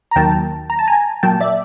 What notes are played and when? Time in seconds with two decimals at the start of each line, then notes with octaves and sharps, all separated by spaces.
0.11 A#5
0.16 D#2 D#3 F#3 A#3 G5 A5
0.70 A#5
0.79 A5
0.88 G#5 A#5
1.23 A#2 F#3 A#3 G5 A5
1.40 D5 E5